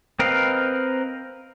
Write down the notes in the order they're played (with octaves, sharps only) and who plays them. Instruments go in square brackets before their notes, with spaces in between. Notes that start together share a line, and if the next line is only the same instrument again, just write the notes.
[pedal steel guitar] C4 A#4 B4 D#5 F5